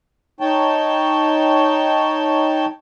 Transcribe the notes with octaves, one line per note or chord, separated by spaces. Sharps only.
D#4 C#5 G5 A5